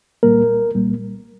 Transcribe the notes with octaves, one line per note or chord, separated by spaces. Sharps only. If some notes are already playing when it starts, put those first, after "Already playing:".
C2 A#2 G3 A#3 A#4
C2 A#2 G3 A#3